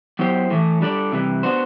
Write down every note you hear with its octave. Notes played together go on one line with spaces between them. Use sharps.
F#3 B3 E4 G4 C5
A2 E3 A3
G3 D4 A4 D5
C3 E3 G3
B3 D4 F#4 C5